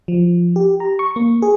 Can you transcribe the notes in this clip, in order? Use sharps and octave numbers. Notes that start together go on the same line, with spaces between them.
F3
G4
A#5
C#6
A#3
G#4